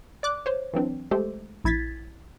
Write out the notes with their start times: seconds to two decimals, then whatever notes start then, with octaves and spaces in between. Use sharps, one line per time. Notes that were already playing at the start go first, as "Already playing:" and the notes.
0.23 D5 D6 F#6
0.46 C5 C#5
0.73 E3 F#3 C4 D4
1.11 G#3 A3 G4 A4 C5
1.64 A#1 E4 G#6 A6 B6